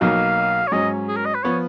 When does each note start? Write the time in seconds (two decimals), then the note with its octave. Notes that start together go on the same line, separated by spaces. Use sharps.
0.01 B1 B2 F#3 A#3 D#4 F5
0.67 C#5
0.72 G#2 F#3 C#4 D#5
1.08 G#4
1.17 A#4
1.26 D#5
1.34 B4
1.43 F3 B3 C#5